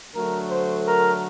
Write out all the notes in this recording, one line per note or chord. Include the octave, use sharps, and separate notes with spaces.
D3 F#3 A3 A#4
C5
A#4